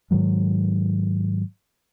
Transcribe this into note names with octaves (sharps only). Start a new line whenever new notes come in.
G#2 D#3 F#3 G#3